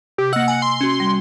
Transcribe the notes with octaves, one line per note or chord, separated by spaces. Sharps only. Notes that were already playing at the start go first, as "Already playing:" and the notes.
C3 G4
A#3 D#5 F#5 E6
G#5
C6
C#4 F#4
G3